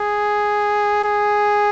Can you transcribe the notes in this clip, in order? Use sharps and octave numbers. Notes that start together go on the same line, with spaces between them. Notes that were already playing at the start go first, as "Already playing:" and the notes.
Already playing: G#4
G#4